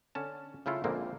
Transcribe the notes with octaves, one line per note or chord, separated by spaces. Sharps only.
D3 C#4 A5
C#3 A3 E4 F4 A4
A#1 D3 G#3 A#3 C4